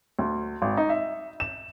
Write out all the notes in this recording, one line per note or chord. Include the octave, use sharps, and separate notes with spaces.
D2
G#1
D#4
E5
E7